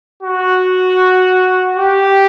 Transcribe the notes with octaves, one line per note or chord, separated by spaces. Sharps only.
F#4
G4